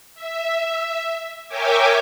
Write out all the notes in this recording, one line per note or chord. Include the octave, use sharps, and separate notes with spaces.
E5
A#4 C#5 E5 G5 G#5 D6